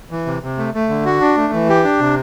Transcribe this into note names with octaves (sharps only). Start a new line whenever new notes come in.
E3
C3
C3
A3
A3
D3
F#4
D4
A3
E3
G4
D4
C3